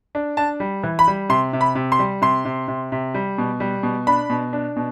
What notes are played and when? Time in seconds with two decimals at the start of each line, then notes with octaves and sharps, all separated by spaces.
0.15 D4
0.37 D4 A5
0.60 G3
0.84 E3
0.99 B5
1.07 G3
1.29 C3 C6
1.53 C3
1.61 B5
1.75 C3
1.92 C6
1.99 G3
2.22 C3 C6
2.45 C3
2.68 C3
2.92 C3
3.14 G3
3.38 B2
3.60 G3
3.83 B2
4.07 D4 B5
4.30 B2
4.53 D4
4.76 B2